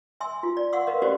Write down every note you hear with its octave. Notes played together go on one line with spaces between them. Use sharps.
E5 G#5 C6 E6
F4
D5
F5 F#5 C6 C#6 E6
A#4 B4 D#5 F5
C#4 F#4 G4 C5 D5